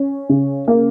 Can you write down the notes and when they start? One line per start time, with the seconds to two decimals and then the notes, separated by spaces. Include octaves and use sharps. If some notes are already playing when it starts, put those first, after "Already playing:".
Already playing: C#4
0.29 C#3
0.68 A#3